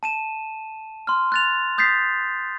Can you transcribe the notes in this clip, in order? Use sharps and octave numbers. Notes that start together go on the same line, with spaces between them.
A5 D#7 E7
C6 F6
F#6 A6 F7
D#6 G6 A6 B6 C7